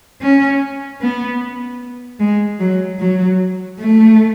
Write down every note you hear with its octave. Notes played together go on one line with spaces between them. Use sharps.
C#4
B3
G#3
F#3
F#3
A3